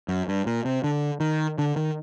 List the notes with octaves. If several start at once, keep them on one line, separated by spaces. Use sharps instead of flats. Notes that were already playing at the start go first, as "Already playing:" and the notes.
F#2
G2
A#2
C3
D3
D#3
D3
D#3